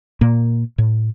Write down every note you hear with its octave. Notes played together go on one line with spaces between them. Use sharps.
A#2 A#3
A2